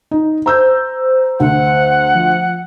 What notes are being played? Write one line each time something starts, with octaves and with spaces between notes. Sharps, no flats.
D#4
C5 A#5 E6 G6
D2 F#5
F3